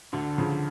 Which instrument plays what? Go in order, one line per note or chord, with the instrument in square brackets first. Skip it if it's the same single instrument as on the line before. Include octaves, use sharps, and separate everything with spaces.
[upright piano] D2 [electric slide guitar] D3
[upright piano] C#3 F3